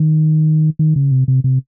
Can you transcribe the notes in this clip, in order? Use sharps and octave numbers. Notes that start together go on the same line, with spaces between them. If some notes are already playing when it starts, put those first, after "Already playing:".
Already playing: D#3
D#3
C#3
C3
C3
C3